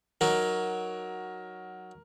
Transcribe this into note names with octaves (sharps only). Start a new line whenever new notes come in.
F#3 D#4 A#4